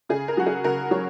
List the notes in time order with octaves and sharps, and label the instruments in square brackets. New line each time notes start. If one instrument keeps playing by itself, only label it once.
[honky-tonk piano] C#3 G#4
A#4
F#3 F#4
G#4
C#3 A#4
F#3 C#5